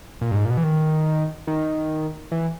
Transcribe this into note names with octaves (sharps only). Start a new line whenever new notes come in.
A#2
G2
G#2
A#2
B2
E3
D#3
D#3
E3